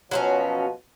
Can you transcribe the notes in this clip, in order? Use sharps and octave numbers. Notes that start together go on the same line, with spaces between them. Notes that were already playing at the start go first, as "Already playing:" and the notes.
B2 F3 F#3 C4 C#4